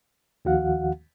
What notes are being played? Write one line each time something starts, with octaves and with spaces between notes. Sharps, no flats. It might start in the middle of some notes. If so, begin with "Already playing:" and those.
D#2 D#3 F3 F#4 F5 F#5